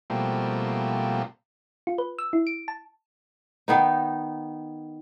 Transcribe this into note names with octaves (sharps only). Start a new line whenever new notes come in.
B2 F3 G3 A3 A#3 C4
F4
B4
E6
E4
D7
A5
D#3 B3 D#4